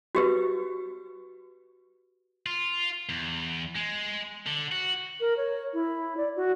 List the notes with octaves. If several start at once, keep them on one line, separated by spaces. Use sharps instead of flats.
F#4 G4 B4
F4
E2
G#3
D3
F#4
A#4
C#5
E4
D5
F#4